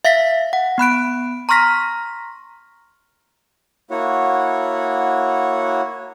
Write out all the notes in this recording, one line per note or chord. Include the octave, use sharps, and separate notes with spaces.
E5 F5 A#6 B6
F#5
B3 B5 F#6 D7
A#5 C6 C#6 F6 A#6 B6
A#3 E4 F#4 C#5 F#5